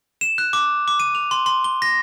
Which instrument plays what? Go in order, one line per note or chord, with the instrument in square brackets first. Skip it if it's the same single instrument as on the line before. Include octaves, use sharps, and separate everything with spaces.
[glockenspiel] E7
F#6
D6
D6
D#7
F7
C6
C6
G7
A#6